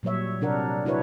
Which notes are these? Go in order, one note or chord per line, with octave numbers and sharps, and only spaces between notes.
A#2 F#3 G3 C#5 E5
C3 D4 A#4 F#5
D4 E4 F#4 B4 C#5